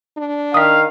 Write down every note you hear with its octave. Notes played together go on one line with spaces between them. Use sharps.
D4
D#3 F5 D#6 B6